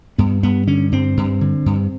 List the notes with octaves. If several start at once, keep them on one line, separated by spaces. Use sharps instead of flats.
G2 B3
G2 B3
D3 C#4
G2 C4
G2
D3
G2